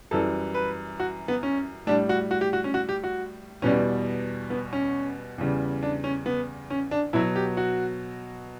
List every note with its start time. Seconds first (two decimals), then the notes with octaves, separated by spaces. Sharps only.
0.11 F#2 E3 G3 A4
0.54 B4
1.00 F#4
1.28 B3
1.43 C#4
1.87 A2 G3 D4
2.09 F#4
2.31 F#4
2.41 G4
2.53 F#4
2.64 C#4
2.74 F#4
2.89 G4
3.04 F#4
3.62 E2 B2 G3 C#4
4.50 B3
4.73 C#4
5.38 E2 C#3 G3
5.83 D4
6.04 C#4
6.26 B3
6.70 C#4
6.91 D4
7.13 B2 F#3 E4
7.36 G4
7.57 F#4